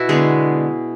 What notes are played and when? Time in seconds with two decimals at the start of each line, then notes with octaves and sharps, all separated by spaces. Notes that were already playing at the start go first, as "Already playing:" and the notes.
Already playing: B2 E4 F#4
0.09 D3 G#3 B3 G#4